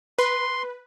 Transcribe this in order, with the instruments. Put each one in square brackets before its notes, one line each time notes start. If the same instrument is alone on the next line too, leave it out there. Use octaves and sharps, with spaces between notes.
[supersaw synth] B4 [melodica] C6